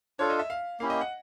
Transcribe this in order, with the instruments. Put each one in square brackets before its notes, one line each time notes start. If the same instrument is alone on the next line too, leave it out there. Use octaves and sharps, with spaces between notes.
[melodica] D4 F4 A4 [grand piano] C#5
[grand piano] D#5
E5
F5
[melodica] A#3 C#4 E4 G4 [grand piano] F5
[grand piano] D#5
F#5